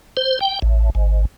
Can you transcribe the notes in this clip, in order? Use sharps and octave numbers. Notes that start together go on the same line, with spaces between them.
C5
G5
A1
G#1